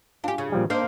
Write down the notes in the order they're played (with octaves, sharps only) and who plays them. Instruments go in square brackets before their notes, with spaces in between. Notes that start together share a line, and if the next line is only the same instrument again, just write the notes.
[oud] D4 G4 [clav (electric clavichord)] F4 G#5
[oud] C#3
[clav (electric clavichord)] A#2 F3 G3
[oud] A#3 D#4 C5 [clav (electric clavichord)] D4